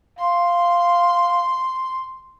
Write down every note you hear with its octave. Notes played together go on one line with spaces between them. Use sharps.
F5 C6